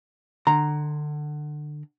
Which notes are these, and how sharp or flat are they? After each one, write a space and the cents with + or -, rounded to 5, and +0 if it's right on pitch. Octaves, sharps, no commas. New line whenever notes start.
D3 +25 A#5 +0